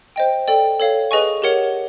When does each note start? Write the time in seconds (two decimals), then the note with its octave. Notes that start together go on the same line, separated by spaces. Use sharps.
0.16 C5 D#5 G5
0.48 A4 D5 G5
0.80 A4 C#5 F5
1.11 G#4 B4 D#5 G#5 C#6
1.42 G4 A#4 C#5 F#5